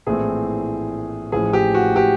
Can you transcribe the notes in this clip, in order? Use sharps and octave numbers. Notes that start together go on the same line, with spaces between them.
A#1 A2 E3 A3 C4 G#4
A1 A2 F3 G#4
G4
F#4
G4